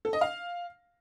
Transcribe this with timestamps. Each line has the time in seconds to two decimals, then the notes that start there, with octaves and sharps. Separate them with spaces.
0.05 A4
0.13 D#5
0.21 F5